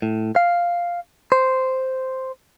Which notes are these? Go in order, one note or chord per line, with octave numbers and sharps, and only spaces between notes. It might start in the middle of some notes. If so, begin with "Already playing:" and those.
A2
F5
C5